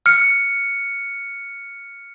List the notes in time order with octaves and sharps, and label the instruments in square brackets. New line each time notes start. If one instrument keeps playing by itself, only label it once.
[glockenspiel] F6 C#7